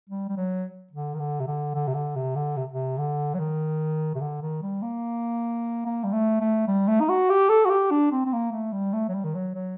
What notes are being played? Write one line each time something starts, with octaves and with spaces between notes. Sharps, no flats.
G3
G3
F#3
D3
D#3
D3
C3
D3
D3
C3
D3
C3
D3
C3
C3
D3
F#3
D#3
C3
D3
D#3
G3
A#3
A#3
G3
A3
A3
G3
A3
D#4
F#4
G4
A4
F#4
G4
D4
C4
C4
A#3
A3
G3
A3
F#3
G3
D#3
F#3
F#3